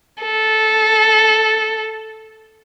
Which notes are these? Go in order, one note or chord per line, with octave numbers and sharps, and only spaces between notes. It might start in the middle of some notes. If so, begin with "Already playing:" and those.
A4